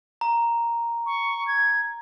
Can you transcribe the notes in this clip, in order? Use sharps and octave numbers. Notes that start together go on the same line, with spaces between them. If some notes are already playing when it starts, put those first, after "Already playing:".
A#5
C#6
G#6